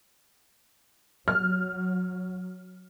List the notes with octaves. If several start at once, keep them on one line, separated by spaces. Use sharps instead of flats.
F#3 F6